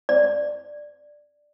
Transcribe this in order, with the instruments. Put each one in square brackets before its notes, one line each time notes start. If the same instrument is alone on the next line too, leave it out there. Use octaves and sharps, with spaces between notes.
[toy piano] D5